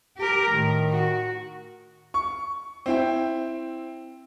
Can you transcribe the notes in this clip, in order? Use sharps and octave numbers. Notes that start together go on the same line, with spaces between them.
G4 A#4
A2 D#3
F#4
C#6
C4 E4 G5